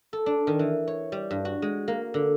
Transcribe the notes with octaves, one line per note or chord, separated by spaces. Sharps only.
A4
D4
D#3
E3
C#5
G3
G2
F#4
G#3
A#3
D3